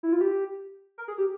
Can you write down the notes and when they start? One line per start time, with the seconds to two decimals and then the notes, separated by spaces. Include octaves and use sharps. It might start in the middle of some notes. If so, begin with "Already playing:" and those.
0.03 E4
0.13 F4
0.21 G4
0.98 A#4
1.08 G#4
1.18 G4